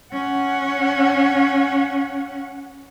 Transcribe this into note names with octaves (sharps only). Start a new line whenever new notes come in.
C#4 F#5